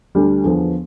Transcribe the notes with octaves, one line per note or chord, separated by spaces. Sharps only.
D2 D3 G3 D4
E2 D3 F3 B3